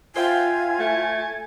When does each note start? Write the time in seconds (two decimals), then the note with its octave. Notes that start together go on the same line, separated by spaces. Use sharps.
0.16 F4 C5 E5 G5 G#5
0.80 A3